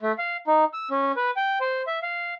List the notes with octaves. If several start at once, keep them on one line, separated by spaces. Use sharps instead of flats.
A3
F5
D#4
E6
C#4
B4
G5
C5
E5
F5